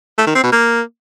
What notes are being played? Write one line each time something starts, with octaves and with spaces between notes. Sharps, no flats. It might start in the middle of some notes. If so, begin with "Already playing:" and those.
A3
D#3
C4
B2
A#3